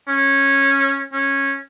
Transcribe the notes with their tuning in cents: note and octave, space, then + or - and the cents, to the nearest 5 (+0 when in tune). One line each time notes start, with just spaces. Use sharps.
C#4 -15
C#4 -10